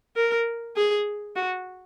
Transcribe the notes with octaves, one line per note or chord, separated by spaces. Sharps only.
A#4
G#4
F#4